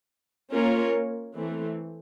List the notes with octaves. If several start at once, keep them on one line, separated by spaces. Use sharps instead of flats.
A#3 C#4 F4 A#4 C#5
E3 A3 C4